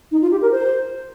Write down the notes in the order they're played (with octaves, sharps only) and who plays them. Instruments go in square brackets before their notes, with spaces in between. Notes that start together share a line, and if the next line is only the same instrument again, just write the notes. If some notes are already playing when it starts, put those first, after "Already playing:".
[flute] D#4
F4
G4
A#4
C5